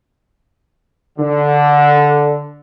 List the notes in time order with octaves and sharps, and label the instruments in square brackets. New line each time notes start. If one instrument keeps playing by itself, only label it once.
[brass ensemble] D3